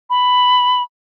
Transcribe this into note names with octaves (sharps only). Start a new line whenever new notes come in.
B5